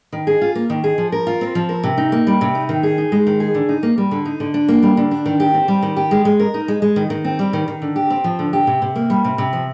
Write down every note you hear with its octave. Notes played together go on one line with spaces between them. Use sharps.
D#3
G#4
F4
A#3
D#3
G#4
F3
A#4
F4
C4
F3
A#4
C3
D#4
A#3
G3
C3
D#4
D#3
G#4
D#4
G#3
D#3
G#4
D3
D#4
A#3
G3
D3
D#4
D3
D4
A#3
G3
D3
D4
D#3
G4
C4
G3
D#3
G4
G#3
G#3
A#4
D#4
G#3
G#3
D#3
D#3
C4
G3
D#3
D#3
D3
G4
C4
F3
D3
G4
C3
C3
A#3
G3
C3
C3
F3